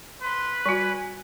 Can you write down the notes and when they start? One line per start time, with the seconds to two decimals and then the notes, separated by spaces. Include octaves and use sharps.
0.22 B4 C6
0.66 G3 F#4 G#5